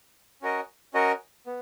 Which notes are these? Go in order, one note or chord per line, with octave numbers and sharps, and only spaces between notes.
C#4 F#4 A#4 D#5
C#4 F#4 A#4 D#5
B3